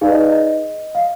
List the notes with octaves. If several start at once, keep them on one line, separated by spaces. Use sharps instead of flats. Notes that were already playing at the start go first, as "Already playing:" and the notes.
D#4 G#4 B4 D5 F5
D#5
D#5
F5